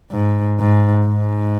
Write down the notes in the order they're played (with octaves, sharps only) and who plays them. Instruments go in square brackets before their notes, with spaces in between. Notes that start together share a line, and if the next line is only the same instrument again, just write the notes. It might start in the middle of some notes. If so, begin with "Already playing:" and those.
[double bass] G#2
G#2
G#2